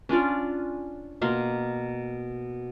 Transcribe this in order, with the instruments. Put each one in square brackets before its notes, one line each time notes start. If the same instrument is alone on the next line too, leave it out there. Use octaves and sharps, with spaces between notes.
[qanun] C#4 D4 F4 D5
B2 A#3 F5 C6